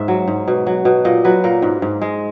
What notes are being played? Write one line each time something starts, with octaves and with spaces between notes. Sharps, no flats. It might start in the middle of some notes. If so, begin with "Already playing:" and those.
Already playing: G#2 E5
F#3
G#2
B2
F#3
B2
A#2 D#5
F#3 B4
A#2 A#4
G#2
G#2
G#3